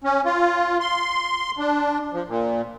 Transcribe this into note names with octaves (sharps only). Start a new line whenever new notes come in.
C#4
F4
C6
D4
F3
A#2